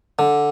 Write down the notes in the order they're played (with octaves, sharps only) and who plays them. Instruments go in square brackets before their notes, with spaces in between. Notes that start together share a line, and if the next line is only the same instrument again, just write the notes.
[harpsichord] D3